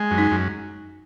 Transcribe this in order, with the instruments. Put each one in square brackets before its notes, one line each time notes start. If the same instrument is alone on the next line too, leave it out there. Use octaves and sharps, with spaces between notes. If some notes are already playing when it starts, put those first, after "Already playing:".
Already playing: [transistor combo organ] G#3
F#2
[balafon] D#4
[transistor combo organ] F#2